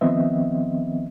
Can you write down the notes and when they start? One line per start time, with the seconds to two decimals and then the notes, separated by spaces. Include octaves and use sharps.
0.01 D#3 F3 B3 C4 D#5 E5